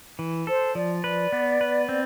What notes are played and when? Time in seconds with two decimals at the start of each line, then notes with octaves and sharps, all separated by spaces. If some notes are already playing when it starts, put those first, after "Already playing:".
0.19 E3
0.47 A4 C5
0.75 F3 D5
1.04 B4
1.32 B3
1.61 B4
1.89 C4